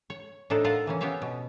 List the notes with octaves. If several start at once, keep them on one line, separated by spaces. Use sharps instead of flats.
C#5
A2 D4 D#4 A4
F4 A4 A#4 F5 F#5
C3 E3 A#3 C#4
B3 C#4 G4 C#5 E5 F5
B2